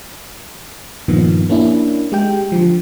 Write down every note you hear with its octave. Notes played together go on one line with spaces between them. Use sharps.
G2 A#2 D#3 F3 B3
A#3 C#4 D4 E4
G#3 G4 G5
D3 F3